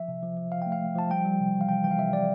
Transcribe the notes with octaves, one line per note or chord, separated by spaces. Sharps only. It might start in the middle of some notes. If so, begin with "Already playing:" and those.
Already playing: F3 E5
C3
F3
F3
F3 F5
A3 G5
F5
A3
F3 A5
G3 G5
G3
C3
E3
F5
C3 G5
E3 G5
F5
C3 E5
C3 D5